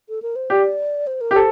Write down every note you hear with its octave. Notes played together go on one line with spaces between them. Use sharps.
A4
A#4
C5
G4 D5
C5
A#4
G4
A4 C5